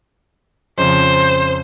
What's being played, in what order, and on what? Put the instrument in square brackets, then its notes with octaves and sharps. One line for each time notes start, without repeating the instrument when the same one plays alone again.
[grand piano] F2 C#3 F3 [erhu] C5